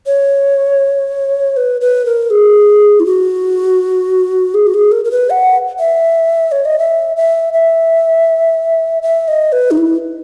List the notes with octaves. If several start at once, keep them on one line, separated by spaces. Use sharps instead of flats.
C#5
B4
B4
A#4
G#4
E4
F#4
G#4
F#4
G#4
A#4
A#4
B4
F#5
E5
C#5
D#5
E5
E5
E5
E5
D#5
B4
D#4
E4